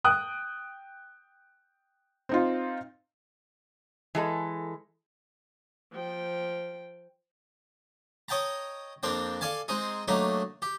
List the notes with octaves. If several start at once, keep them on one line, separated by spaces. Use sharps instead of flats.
G5 D#6 F#6
C4 D#4 F4
E3 G#3 A4
F3 G5
C#5 D#5 G5 A5 A#5
F2 A#3 C4 D4 G5
A4 D5 F5 G#5 A5
G#3 C4 D#4 G#4
F#3 A3 A#3 D4 D#4
G4